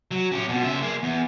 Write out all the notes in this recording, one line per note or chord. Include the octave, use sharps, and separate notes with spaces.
F#3
C#4 G4
F2 B2
C#3 E5
A#3 G#4
E2